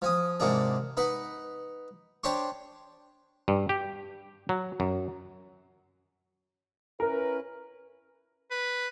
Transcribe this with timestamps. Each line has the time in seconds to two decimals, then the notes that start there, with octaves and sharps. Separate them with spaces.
0.02 F3 G#5 D#6
0.40 G#2 C3 A#3 D4 G#4
0.97 D#4 B4 F#5
2.24 D4 G4 C5 C#5 C6 C#6
3.48 G2
3.69 G4
4.49 F#3
4.80 F#2
7.00 C#4 E4 A#4 B4
8.51 B4